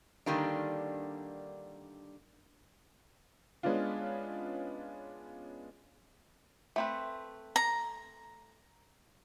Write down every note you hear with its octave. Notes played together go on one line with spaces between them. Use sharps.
D3 D#3 G3 A#3 D4
G#3 B3 C#4 D4 F4
A3 C4 B4
A#5